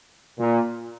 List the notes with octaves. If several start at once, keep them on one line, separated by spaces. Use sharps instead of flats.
A#2